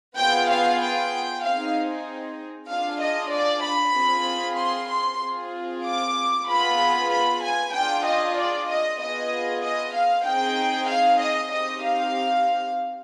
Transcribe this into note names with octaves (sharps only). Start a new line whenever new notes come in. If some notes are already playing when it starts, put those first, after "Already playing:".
B3 F4 G#4 G5
F5
G5
C4 D#4 G#4 F5
D4 F4 G#4 F5
D#5
D5
B5
C4 F4 G#4
C6
C6
C4 F4 G#4
D6
B3 F4 G#4 B5
B5
G#5
D4 F4 G#4 G5
D#5
D5
D#5
B3 F4 G#4 D#5
D#5
F5
C4 D#4 G#4 G5
F5
D#5
C4 D#4 G4 D#5
F5